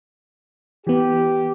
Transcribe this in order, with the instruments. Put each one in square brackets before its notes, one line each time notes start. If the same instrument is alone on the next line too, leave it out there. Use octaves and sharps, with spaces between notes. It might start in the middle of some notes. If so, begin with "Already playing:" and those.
[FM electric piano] E3 B3 [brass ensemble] G4